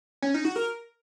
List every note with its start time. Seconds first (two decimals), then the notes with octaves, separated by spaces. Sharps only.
0.22 C#4
0.34 D#4
0.45 F#4
0.56 A#4